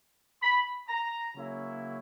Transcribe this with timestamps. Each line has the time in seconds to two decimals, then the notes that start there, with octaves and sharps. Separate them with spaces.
0.42 B5
0.88 A#5
1.34 C#3 F#3 A#3 C#4 E4